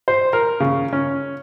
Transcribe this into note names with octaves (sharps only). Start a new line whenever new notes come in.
C5
A#4
C#3
C#4